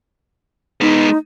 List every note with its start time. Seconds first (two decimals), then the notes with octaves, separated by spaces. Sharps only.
0.81 G#3 B3 D#4